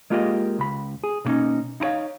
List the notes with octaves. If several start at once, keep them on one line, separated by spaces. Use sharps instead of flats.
G#3 A#3 F4 G4 D5 D#5
C#2 B5
G#4
B2 D3 A#3 C#4 D#4
D#4 E4 G#4 C#5 F5